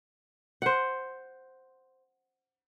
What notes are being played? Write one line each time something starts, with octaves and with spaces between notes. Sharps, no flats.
C5 F#5